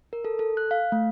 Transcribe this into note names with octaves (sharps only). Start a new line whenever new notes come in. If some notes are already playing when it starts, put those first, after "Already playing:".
A#4
A4
A4
F#6
F5
A3